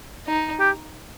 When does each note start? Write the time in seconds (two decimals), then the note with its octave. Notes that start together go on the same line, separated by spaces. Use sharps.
0.26 D#4
0.60 G4